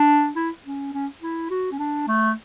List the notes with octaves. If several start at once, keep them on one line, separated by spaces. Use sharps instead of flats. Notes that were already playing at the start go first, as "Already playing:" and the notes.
Already playing: D4
E4
C#4
C#4
E4
F#4
C#4
D4
A3